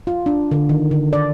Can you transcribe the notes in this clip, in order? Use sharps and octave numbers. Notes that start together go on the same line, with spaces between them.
F4
D4
D3
D#3
D3
D5